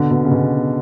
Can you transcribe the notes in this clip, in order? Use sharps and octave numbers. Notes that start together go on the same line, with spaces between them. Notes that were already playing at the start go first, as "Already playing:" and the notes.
Already playing: B2 D3
B2
C#3
B2